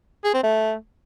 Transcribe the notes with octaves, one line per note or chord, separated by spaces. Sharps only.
G#4
C4
A3